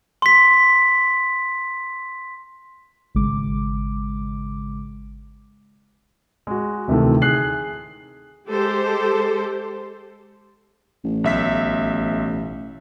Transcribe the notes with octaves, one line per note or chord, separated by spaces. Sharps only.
C6 B6
G#1 C#3 G#3 D6
G#3 F#4
D2 C3 D#3 E3 A3
G#4 F#6 C7 F#7
G#3 G4 A4 C5
A1
B1 E5 B6